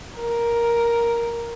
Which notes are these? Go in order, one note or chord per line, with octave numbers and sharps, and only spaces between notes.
A#4